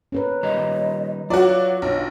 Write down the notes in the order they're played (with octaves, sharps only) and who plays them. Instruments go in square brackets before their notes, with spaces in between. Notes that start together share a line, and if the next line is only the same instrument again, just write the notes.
[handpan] C#4 A#4 B4
[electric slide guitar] D#3 G3 A#5 [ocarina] D#5
[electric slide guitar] F#3 [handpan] F4 [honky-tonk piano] F#4 D5 [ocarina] C#5
[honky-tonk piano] B1 [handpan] D4